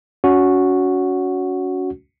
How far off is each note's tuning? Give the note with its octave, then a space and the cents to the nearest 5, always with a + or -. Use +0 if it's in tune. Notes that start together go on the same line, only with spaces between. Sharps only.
C#4 +30 F#4 -5